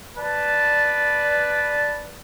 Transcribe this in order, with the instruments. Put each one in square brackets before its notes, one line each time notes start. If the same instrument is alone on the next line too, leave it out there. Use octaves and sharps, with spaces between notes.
[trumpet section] B4 D5 A5